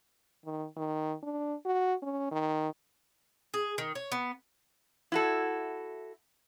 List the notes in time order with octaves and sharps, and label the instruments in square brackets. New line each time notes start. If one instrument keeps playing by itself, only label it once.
[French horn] D#3
D#3
D4
F#4
C#4
D#3
[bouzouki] G#4
D#3
C#5
B3
[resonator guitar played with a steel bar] E4 F#4 A4